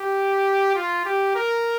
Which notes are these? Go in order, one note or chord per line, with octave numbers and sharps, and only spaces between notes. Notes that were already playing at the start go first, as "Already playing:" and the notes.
Already playing: G4
F4
G4
A#4